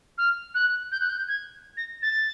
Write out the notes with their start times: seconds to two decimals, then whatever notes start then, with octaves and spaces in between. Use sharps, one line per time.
0.18 F6
0.55 F#6
0.92 G6
1.00 F#6
1.09 G6
1.28 G#6
1.77 A#6
2.02 A6